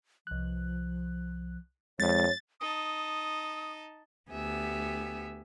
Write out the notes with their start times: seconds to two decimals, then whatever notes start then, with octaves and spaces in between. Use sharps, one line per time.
0.27 C2 F3 F#6
2.00 F2 G#3 C#5 A6
2.60 D#4 A5 D#6
4.32 D2 B3 G4 E5 G#5